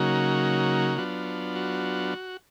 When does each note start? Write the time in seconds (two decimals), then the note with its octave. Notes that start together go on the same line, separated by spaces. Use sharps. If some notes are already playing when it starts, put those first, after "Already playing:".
Already playing: C#3 F#3 A#3 D#4 F#4
0.98 F#3 B3 D4 F4
1.56 F#4